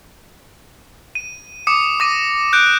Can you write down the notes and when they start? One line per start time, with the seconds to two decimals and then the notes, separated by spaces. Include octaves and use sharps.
1.15 D#7
1.67 D6 D#6 C#7
2.00 D6 A#6 D#7
2.53 F#6 G6 D7